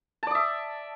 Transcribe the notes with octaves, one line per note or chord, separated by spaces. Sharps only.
D5 E5 A5 D#6